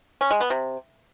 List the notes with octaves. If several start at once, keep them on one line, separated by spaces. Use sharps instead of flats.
C#4
G#3
B3
C3